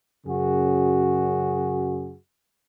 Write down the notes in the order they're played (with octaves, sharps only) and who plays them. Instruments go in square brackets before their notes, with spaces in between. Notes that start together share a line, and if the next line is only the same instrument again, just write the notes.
[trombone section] F#2 C#3 F#4 G#4